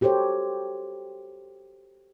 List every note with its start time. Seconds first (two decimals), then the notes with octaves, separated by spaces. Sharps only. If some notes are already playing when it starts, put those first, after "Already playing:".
0.01 F#4 G4 A4 C5 C#5